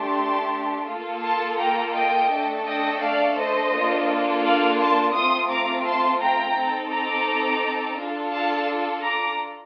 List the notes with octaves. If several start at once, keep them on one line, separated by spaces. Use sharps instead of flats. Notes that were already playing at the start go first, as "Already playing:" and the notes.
Already playing: A3 D4 G4 A5 C6
A#3 F4 A4
A5 C6
G5 A#5
D#5 G5
A3 D4 A4
D#5 G5
D5 F5
C5 D#5
A#3 D4 F4 A4
D5 F5
A5 C6
A3 C4 F4 C6 D#6
A#5 D6
A5 C6
G5 A#5
C4 D#4 A4
A#5 D6
D4 F4 A4
F5 A5
A#5 D6